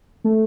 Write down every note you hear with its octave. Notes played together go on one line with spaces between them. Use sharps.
A3